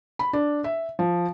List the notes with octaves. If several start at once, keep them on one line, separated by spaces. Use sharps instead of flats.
B5
D4
E5
F3